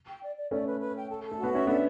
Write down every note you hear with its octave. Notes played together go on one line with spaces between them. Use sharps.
G5
D5
D5
A3 C#4 D5
B4
B4
G5
A4
A4
A3
F#4
B3
C#4 E5
B3 D4 A4